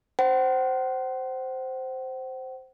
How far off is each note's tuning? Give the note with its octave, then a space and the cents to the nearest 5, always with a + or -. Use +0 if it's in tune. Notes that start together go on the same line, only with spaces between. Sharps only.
C5 +0 F#5 +45